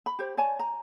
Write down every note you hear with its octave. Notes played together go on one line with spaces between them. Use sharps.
B5
G4 C5
C#5 D5 G#5 A5
A#5